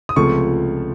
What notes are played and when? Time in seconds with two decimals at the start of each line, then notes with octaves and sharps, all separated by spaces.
0.09 D#6
0.16 C#2 C3 F3 A3 C#6